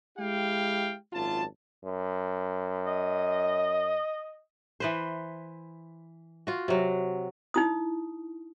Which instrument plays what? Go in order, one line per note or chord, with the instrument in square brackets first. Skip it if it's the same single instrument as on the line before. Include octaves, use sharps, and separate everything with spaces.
[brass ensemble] G#3 E4 G4 F5 G5
G#1 F#2 F4 A5
[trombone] F#2
[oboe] D#5
[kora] E3 B4 C5
F4 F#4
C3 F#3
[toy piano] D#4 E4 D#6